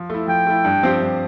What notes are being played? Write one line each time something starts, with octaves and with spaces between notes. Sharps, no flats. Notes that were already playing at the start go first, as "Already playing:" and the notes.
Already playing: F3
A3 E4
F3 G5
A3 E4
G2
F3 C4 G4 C5
G2